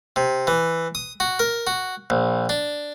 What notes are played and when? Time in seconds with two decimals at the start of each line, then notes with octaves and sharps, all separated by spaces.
0.16 C3
0.47 E3
0.95 D#6
1.20 F#4
1.39 A#4
1.67 F#4
2.10 A#1
2.49 D4